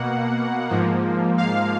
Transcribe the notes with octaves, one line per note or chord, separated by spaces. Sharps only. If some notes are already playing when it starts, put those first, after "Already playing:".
Already playing: B2 A#3 F#5
G#2 F3 A#3
F5